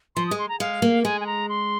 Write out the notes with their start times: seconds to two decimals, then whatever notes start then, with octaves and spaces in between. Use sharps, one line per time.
0.16 F3 C6
0.27 G#3 D#6
0.39 C6
0.49 A#5
0.60 G#3 F5
0.82 A#3
1.04 G#3 G#5
1.21 G#5
1.27 A#5
1.49 C6